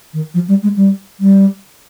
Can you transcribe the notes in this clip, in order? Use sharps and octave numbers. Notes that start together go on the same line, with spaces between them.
D#3
F3
G3
G#3
G3
G3